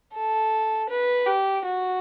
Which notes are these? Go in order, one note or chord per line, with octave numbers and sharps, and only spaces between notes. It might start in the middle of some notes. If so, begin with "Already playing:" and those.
A4
B4
G4
F#4